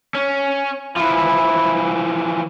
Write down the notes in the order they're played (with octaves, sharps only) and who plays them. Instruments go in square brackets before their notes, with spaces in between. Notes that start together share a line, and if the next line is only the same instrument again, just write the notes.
[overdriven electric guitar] C#4
[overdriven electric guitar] E3 F3 [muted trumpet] E4